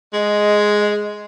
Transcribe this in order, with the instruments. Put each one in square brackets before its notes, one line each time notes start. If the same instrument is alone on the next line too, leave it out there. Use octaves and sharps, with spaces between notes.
[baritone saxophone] G#3 [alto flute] D#5